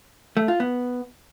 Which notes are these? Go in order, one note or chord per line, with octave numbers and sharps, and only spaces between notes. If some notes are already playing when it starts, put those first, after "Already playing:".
A3
F4
B3